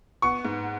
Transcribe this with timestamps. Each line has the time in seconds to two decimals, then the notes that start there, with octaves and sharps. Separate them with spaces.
0.22 B3 C#6
0.45 G#2